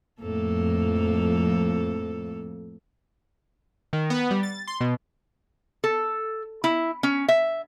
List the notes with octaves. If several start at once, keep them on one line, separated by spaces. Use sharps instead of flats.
F2 A2 A#3 A4
D#3
B3
G3
A6
C6
B2
A4
E4
C#4
E5